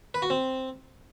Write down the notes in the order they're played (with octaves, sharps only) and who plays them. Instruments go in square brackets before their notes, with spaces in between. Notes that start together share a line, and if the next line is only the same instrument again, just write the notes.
[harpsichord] B4
F#4
C4